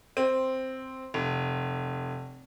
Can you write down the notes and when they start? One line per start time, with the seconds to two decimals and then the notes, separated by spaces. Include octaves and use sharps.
0.17 C4
1.14 F1